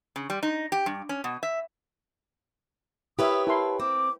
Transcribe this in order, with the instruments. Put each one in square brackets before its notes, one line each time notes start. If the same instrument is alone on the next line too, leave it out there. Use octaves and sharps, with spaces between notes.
[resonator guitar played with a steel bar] C#3
G3
D#4
G4
G2
C#4
B2
E5
[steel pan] E4 A#4 E5 [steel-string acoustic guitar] G4 B4 C#5 [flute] D#6
[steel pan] E4 A#4 C6 [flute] A5
[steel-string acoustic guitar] C4 [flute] D6